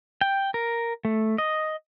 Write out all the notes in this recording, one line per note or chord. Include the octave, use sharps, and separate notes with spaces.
G5
A#4
A3
D#5